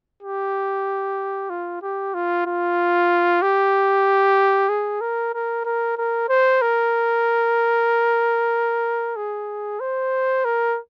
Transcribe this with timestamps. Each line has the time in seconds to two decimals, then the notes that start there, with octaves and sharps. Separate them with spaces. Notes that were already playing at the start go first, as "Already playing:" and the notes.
0.23 G4
1.50 F4
1.82 G4
2.14 F4
2.46 F4
3.42 G4
4.69 G#4
5.01 A#4
5.34 A#4
5.65 A#4
5.98 A#4
6.29 C5
6.62 A#4
9.16 G#4
9.80 C5
10.45 A#4